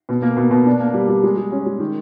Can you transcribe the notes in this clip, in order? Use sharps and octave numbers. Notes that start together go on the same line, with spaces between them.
B2
A#3
B2
B2
D4
A#3
G3
G3
G#3
G#3
C#4
G#3
D#3